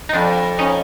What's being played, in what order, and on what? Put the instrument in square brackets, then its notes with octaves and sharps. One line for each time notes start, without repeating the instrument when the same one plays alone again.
[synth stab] D#4
[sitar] F2 [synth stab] C4 D4
[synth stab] C#4 D#4